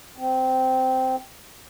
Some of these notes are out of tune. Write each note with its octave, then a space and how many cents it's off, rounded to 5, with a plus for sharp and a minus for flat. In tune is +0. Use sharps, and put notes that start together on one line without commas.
C4 -15